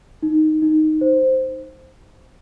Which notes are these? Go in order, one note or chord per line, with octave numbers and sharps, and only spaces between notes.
D#4
D#4
C5